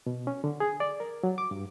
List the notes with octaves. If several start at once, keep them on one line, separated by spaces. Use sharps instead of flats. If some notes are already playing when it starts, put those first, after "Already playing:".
B2
C#4
D3
G#4
D5
A#4
F#3
D6
G2